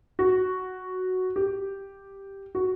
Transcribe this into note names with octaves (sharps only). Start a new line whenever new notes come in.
F#4
G4
F#4